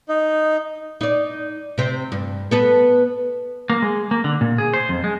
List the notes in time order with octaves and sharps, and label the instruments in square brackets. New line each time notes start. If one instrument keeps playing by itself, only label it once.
[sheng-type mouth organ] D#4
[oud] D#4 D5
C3 C4
G2
B3 A4 B4
[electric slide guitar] A#3
G#3
A#3
D3
A#2
G#4
C5
F2
G#3